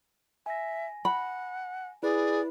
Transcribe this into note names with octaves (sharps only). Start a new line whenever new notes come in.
E5 G#5 A#6
F#5 B5
E4 G#4 B4 D5